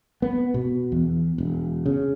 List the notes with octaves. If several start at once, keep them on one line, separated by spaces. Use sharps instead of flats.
B3
B2
E2
E1
C#3